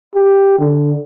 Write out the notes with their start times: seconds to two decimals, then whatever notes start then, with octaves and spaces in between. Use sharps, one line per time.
0.15 G4
0.59 D3